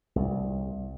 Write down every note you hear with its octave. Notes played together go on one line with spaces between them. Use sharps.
C2